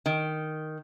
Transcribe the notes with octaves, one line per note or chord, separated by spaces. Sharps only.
D#3